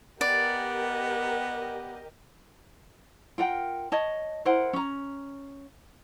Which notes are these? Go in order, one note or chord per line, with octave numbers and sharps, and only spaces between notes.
B3 G4 A#4 D5 D#5
F4 A#4 F#5 G5
C#5 D#5 A5
E4 A#4 C5 F#5
C#4 A#5